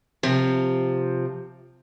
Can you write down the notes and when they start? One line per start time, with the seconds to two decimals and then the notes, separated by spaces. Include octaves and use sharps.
0.23 C3 F3